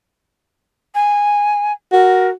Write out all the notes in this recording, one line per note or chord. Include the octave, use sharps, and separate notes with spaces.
G#5
F#4 A#4